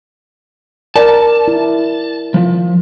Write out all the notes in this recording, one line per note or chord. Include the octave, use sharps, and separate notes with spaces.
A#4 D5 A5
E4
F3